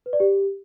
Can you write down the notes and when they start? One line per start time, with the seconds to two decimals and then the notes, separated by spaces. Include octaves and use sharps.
0.06 B4
0.13 D5
0.20 G4